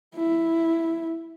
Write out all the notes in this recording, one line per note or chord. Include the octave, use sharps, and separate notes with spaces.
E4